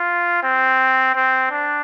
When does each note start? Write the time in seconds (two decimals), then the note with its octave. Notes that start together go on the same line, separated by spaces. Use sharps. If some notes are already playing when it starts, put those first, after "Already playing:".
Already playing: F4
0.43 C4
1.15 C4
1.51 D4